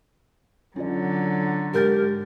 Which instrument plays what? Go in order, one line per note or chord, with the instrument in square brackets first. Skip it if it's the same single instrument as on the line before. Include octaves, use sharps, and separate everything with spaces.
[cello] D3 F#3 [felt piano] C#4 F4 D5
[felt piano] G#2 G6 A6 [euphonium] G4 [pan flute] A#4